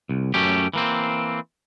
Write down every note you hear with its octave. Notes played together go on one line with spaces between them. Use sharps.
C2
F#2 A3 C#4 G4
E3 A#3 C4